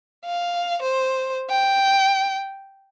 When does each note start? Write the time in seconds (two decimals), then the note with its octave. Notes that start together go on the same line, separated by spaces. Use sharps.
0.25 F5
0.82 C5
1.50 G5